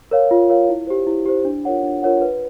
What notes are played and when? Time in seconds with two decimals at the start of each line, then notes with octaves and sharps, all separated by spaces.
0.11 A#4 C#5 F5
0.31 F4
0.50 A#4 C#5 F5
0.69 E4
0.87 G4 C5
1.07 E4
1.26 G4 C5
1.45 D4
1.65 F4 A#4 C#5 F#5
1.83 D4
2.03 F4 A#4 C#5 F#5
2.22 B4